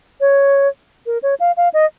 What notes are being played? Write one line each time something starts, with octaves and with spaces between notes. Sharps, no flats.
C#5
A#4
C#5
F5
F5
D#5